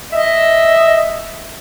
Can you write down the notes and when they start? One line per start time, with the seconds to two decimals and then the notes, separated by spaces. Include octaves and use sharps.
0.13 D#5 E5